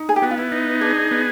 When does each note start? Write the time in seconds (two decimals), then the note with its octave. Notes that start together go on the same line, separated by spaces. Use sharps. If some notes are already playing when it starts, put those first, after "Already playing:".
Already playing: D#4
0.09 G#4
0.16 G4
0.22 B3 F#4
0.31 F4
0.38 E4
0.52 D#4
0.81 D4 G#4
1.11 B3